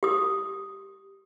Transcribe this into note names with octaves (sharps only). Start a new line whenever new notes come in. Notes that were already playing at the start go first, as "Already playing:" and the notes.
G4 D#6